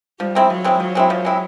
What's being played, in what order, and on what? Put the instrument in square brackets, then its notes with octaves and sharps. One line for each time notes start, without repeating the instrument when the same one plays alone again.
[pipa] F3 [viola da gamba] G3
[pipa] G#3 C4 E4
[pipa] F3 [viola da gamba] F#3
[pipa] G#3 C4 E4
[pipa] F3 [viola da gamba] F#3
[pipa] G#3 C4 E4
F3
G#3 C4 E4